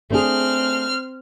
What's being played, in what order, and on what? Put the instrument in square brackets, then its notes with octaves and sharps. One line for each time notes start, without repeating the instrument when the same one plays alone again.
[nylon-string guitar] A3 D4 G#4 [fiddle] C4 F6